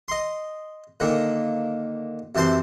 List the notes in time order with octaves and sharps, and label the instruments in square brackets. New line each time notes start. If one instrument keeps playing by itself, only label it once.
[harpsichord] D#5 C6
A#2 D3 D#3 A#3
F#2 C3 E3 C5 A5 C6